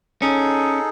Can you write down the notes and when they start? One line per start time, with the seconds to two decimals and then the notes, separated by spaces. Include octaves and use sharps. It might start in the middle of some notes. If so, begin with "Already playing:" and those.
0.22 C#4 D#4 G#4 A4